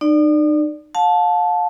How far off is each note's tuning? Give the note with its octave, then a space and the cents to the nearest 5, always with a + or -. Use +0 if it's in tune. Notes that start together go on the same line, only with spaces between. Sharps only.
D#4 -40 D5 +5
F5 +40 A5 -10